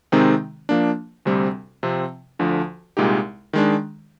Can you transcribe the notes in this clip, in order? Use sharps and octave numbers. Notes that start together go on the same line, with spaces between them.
C3 D#3 G#3 C4 D#4
F3 A#3 D4
D2 C3 G3 C4
C3 F3 C4
D2 D3 F3
C2 A#2 G#3 D#4 G4
D#3 G#3 D4